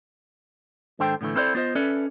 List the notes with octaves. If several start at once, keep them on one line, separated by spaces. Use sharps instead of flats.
G#2 D#3 D4 A4 C5 G5
A2 D3 E3 A3
C4 E4 A4 A#4 C5 D5
B3 F4 C5 D#5
C#4 A4 B4 D5 E5